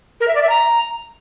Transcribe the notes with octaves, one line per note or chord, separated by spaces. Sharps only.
A#4
E5
D5
E5
A#5